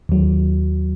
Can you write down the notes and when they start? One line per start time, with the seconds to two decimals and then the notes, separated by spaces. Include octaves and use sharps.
0.09 D#2 F#3